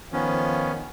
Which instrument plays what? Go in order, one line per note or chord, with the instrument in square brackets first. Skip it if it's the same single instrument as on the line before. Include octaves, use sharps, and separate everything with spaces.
[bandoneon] D#3 B3 C#4 [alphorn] F3